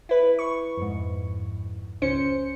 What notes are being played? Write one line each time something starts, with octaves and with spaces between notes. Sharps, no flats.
E4 B4
C#6
F2 G#2
C#2 C#4 C5 C#7